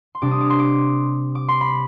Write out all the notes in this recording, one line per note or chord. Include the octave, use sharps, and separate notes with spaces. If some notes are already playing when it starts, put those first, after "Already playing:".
C6
C3 G3 D4 D6
D#6
D6
C6
D6
D6
C6
B5